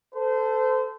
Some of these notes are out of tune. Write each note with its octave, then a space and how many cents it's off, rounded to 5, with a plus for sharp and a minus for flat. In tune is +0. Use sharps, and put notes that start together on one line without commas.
A4 +0 C5 -30